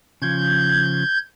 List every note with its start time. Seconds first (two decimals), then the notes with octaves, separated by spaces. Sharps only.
0.22 C#3 F3 G6 G#6